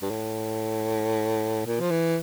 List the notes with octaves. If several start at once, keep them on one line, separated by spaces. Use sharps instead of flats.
G2
A2
A#2
F3
E3